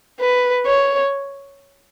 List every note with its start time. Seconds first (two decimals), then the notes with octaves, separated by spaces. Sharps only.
0.20 B4
0.67 C#5